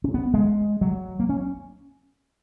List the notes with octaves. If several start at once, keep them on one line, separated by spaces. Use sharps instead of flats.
C#4
B3
G#3
F#3
A#3
C#4